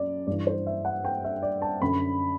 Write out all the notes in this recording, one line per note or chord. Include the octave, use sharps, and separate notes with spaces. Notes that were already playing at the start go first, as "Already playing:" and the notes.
Already playing: F#2 D5
G2 E3 D5
C5
E5
F#5
G5
E5
D5
A5
F#2 D3 B5